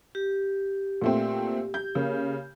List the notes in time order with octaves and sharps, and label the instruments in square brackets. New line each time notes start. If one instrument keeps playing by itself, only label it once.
[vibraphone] G4
[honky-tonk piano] A#2 A3 C4
G6
C#3 A#3